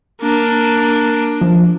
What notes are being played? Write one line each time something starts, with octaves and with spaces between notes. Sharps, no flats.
A#3 D4
F3